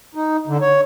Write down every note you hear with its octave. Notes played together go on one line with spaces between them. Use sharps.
D#4
D3
C#5